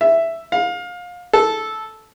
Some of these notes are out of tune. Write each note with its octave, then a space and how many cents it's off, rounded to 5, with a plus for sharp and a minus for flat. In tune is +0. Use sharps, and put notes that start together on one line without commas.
E5 +5
F5 +25
A4 -10